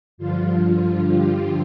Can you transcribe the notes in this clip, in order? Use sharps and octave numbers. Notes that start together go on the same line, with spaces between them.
G2 D3 F3 F4
G4